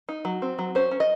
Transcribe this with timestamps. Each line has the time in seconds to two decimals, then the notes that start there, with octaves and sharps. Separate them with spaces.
0.09 D#4
0.25 F#3
0.42 C4
0.59 F#3
0.75 C#4 C5
0.91 C#4
1.00 D#5